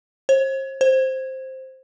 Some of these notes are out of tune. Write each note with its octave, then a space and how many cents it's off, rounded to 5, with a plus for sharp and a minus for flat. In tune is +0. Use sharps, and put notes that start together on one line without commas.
C5 +40
C5 +5